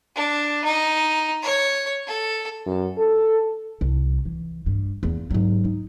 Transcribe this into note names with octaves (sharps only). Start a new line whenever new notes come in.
D4
D#4
C#5
A4
F#2
A4
C2
E3
G2
E2 A#3
G#2 F#3
D#4